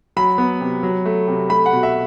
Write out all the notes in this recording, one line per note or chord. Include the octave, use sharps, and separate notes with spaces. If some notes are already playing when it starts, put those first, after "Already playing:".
F#3 B5
B3
C3
F#3
A3
C3
A3 B5
F#5
B2
E5